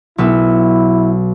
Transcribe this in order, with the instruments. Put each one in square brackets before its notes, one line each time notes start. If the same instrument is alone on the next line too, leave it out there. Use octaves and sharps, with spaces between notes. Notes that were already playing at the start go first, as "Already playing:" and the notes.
[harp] B1 B3 E6 [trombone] E4